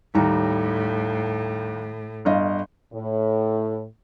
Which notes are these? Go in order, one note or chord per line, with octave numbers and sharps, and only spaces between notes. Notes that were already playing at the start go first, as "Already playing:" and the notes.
D#2 A2 G3 A#5
G1 D#5 F5
A2